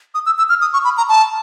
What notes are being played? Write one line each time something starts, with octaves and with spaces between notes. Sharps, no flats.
D#6
E6
E6
F6
D#6
C#6
B5
A#5
A5